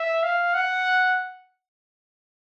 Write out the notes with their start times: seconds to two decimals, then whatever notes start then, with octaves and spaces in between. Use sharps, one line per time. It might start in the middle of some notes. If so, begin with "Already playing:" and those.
Already playing: E5
0.23 F5
0.54 F#5